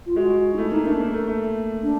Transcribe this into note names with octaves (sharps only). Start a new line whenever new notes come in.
F4
G#3 F#4
D#4
A3 E4
A#3 D#4
A3 D4
A#3
A3
A3
D4